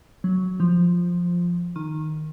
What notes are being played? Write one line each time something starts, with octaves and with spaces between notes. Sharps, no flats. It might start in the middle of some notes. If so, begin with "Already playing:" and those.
F#3
F3
D#3